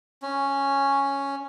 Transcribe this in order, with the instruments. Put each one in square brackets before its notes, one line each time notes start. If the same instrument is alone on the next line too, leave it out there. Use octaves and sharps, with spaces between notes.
[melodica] C#4